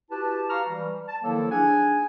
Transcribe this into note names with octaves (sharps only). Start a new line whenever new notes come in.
E4 F#4 G4 B4 A5
G4 B4 F5 A#5 C#6 F6
E3 G3
A5
D#3 F3 F#3 A#3 E4 A4
D4 D#4 G#4 F#5 G#5